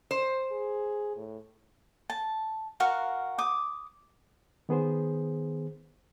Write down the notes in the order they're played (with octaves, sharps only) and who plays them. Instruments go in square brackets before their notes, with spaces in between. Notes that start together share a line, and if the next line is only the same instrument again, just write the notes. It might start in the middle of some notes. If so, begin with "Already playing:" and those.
[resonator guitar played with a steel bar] C5
[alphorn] G#4
A2
[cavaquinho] A5
F#4 A#4 F5 F#5
D6 D#6
[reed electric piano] D#3 B3 G#4 C5